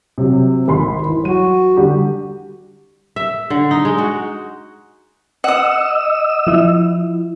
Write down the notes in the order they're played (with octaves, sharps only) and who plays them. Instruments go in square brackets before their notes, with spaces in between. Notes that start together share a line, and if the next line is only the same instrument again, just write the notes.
[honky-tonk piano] C3 F#3
G#1 B5 C6
E3
[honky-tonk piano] F#3 D#7 [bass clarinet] F#4
[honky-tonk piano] D3 G3 G4
[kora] E5
D3
D#4
G#3
F#4
[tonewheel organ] D#5 E6 [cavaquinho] F#5 D#6
[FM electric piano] F3 E4